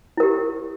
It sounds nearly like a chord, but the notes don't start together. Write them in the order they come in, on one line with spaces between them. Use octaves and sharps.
E4 A#4 G4